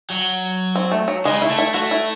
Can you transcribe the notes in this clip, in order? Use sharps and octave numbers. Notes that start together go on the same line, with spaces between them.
F#3
C4
A3
F#3
C#3 G#3
E4
A3
E4
A3 F#4
E4